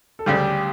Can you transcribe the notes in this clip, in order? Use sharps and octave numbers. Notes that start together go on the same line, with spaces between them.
A4
D2 C#3 G3 G4